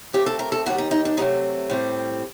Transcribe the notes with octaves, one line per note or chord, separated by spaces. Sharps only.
A#2 A3 C4 G4
A4
A#4
A4
D#2 D#3 G3 F#4
D#4
D#4
D4
C3 D#3 F#3 A3 C4 D#4
A2 G3 C4